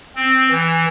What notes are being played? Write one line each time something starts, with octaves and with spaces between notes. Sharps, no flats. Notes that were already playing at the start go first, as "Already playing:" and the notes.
C4
E3